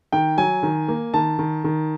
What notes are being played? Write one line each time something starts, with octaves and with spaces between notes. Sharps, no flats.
D#3 G5
F#3 G#5
D#3
A#3
D#3 A5
D#3
D#3